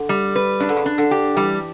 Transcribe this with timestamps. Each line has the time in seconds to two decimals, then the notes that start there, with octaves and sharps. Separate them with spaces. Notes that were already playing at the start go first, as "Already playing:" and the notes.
Already playing: D3
0.09 G3
0.36 B4
0.60 C#3 D4
0.69 D3
0.77 C#3
0.86 D4
0.98 D3
1.11 G4
1.36 E3 G3